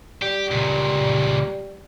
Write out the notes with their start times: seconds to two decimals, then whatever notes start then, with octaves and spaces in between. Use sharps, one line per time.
0.22 G3 G4
0.51 C#2 A#2